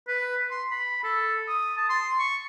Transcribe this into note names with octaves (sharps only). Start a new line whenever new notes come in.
B4
C6
B5
A4
D#6
A5
C6
C#6